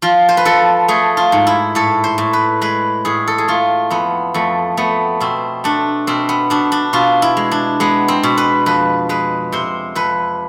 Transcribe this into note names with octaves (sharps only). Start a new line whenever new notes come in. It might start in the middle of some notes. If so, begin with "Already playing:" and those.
F3 F4
C5
B4
F3 A4
A3 G#4
F4
G#2
E4
A2 A4
C5
A2
B4
G#3 B4
A2 G#4
A4
G#4
A3 F4
F2 B3
F2 A3
A3 B3
B2 C4
A3 D4
B2 C4
B3
B2 D4
D4
B2 F4
E4
G#3
D4
G#3 B3
C4
B2
B4
F2 B4
G#3 B4
C3 C5
F2 B4